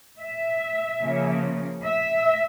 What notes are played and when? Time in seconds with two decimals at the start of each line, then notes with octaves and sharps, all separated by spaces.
0.18 E5
1.00 C#3 F3 A#3 C#4
1.83 E5